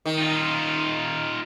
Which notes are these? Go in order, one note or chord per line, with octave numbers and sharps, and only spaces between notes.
D#3
D#4 F4